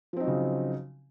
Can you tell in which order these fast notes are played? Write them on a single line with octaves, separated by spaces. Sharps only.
F3 C4 D#4 F#3 C#3